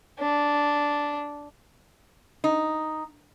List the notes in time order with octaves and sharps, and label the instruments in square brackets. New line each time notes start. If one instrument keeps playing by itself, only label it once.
[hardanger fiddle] D4
[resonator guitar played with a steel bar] D#4